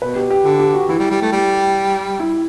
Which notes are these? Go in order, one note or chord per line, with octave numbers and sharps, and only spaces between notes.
B2 B4
G4
G4
D3 G4
G4
F#4
E3 E4
G3
G3
A3
G3
E4